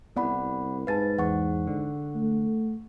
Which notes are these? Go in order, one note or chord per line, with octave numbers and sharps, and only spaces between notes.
C2 B3 E4 D5 F#5 B5
G#2 B4 F5 G#5 A5 A6
E2 F#5 C#6
D3
A3